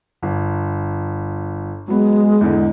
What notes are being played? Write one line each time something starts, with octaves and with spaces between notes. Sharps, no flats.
G1
F#3 G#3 B3
E2 G#2 D3